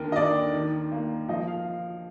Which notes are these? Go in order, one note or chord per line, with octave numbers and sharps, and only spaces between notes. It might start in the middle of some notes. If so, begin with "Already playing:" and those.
Already playing: D#2 D3 A#4
D#5
D#2 D5
D#3
A#3
F3 D#5
F5